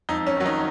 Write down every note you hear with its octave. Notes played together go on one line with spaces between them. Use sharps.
F2 D#4
C#4
D#3 F#3
D#4